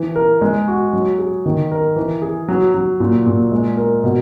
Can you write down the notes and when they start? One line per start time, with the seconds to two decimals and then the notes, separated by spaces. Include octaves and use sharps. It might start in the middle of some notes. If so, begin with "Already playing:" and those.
Already playing: E3
0.16 A#4
0.41 G#3
0.68 F#4
0.93 F#3
1.19 G#4
1.46 D#3
1.71 A#4
1.96 E3
2.22 G#4
2.48 F#3
2.74 F#3
3.00 A#2
3.26 A#2
3.52 G#3
3.77 A#4
4.04 B2